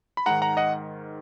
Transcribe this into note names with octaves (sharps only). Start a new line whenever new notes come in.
B5
G#2 D#3 F#5 A#5
F#5 A#5
D#5 F#5